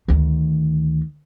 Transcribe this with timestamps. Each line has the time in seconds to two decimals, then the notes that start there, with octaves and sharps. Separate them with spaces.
0.08 D2 D#3